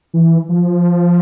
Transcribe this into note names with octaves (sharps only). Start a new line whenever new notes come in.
E3
F3